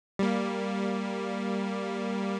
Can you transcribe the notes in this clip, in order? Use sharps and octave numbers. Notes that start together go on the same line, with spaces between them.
G3 A#3